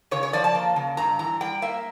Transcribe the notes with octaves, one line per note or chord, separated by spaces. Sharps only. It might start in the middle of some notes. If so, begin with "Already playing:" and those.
C#3 C#5
C#5
F3 D5
A5
A#3
C#3
G2 A#5
E3 A#5
G3 G5
A#3 E5